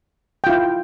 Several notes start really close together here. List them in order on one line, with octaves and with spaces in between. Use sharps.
G5 F4 E4